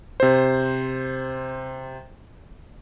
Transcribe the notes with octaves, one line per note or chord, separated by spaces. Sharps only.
C3 C5